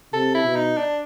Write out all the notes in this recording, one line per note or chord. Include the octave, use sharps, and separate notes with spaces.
C3 A4
E4
B2
D#4
D4